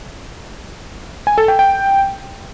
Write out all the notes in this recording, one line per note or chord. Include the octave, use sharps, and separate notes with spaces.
G#5
A4
G5
G5